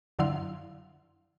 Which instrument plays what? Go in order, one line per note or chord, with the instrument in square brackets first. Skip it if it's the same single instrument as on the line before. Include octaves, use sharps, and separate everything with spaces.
[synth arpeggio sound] F#2 D3 F#3 E4 F5 C6